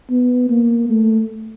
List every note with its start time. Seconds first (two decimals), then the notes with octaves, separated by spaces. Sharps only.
0.10 B3
0.50 A#3
0.90 A3